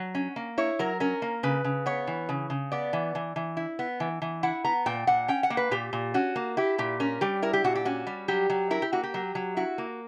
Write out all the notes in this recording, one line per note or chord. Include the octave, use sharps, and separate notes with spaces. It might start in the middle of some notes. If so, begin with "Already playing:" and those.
Already playing: F#3
C#4
A#3
E4 C#5
F#3 A#4
C#4 A#4
A#3
C#3 B4
C#3
B3 C#5
E3
C#3
C#3
B3 D5
E3
E3
E3
E4
B3
E3
E3
E4 F#5
B3 A#5
A#2 G5
A#2 F#5
C#4 G5
F#5
A#3
B4
A#2 G4
A#2
C#4 F#4
A#3
E4 G4
A#2 G4
C#4 A#4
G3 G4
E4 A#4
G4
A#2 F#4
G4
C#4 F#4
G3
F#3 G4
F#3
E4 A#4
G4
A#3 F#4
G4
F#3
F#3
E4 F#4
A#3